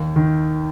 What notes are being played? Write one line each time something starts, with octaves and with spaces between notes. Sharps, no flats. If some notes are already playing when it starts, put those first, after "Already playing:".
Already playing: D#2
D#3